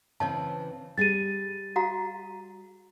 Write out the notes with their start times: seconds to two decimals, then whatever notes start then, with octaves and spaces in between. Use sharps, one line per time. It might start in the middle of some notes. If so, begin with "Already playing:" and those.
0.20 C#3 E3 C4 C#5 D#5 A5
0.98 G3 G#4 A6 D#7
1.76 F#4 F5 A#5